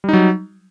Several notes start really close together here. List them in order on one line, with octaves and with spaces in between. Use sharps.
G3 D#4 F#3